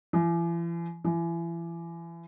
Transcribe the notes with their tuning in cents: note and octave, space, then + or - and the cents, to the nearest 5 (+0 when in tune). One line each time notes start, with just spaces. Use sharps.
E3 +40
E3 +30